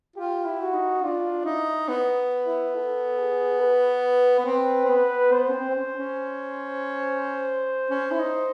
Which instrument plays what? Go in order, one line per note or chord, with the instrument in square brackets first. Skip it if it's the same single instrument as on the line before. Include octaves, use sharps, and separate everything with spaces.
[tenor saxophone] F4 [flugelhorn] G4
[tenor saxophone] E4
[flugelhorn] F#4
[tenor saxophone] D#4
[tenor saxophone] D4 [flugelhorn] F4
[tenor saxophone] D#4 [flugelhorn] E4
[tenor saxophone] B3
[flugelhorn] E4
A4
G#4
B4
[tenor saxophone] B3
C4
C4
B3
[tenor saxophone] B3 [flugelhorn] C5
[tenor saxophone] C#4
C4
C4
C#4
C#4
C#4
E4
D#4